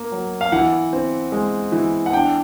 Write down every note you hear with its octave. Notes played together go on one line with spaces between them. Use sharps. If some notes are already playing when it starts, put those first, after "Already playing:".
Already playing: A#3
F#3
F5
E3 F#5
C4
G#3
E3
F#5
D4 G5